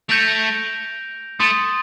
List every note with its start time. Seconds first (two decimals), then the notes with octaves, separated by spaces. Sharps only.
0.09 A3 G6 A#6 D7 F7
1.40 A3 C6 D#6 A6